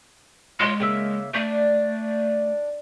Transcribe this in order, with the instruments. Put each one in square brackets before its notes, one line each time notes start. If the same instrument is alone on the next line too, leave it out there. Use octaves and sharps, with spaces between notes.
[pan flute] G#3 [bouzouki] F4 C#5
[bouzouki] C#3 A#3 E5
[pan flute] A3 [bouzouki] D4